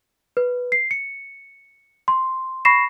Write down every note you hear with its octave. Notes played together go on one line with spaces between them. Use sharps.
B4
C7
C#7
C6
B5 C#6 A#6 C7 E7